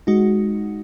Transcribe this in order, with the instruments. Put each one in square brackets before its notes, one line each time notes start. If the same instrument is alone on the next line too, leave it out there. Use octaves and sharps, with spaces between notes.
[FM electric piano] G#3 D#4 F#4